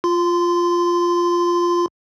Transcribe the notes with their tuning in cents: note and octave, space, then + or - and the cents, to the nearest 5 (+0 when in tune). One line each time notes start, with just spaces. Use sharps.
F4 +0 C6 -20